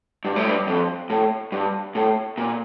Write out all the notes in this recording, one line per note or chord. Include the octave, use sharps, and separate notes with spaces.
G2
A2
G2
F2
A2
G2
A2
A#2